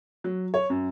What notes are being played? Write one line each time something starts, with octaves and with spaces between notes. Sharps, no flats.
F#3
C#5
F#2